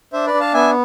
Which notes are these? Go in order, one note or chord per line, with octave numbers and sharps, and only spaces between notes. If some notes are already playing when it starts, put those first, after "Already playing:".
D4 C5 E5
B4 D5
D4
F5 A5
B3 E5 G#5